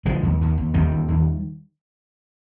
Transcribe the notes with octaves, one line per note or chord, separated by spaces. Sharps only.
D3 F3 G#3
D#2
D#2
D#2
D#2 D#3 G3
D#2
D#2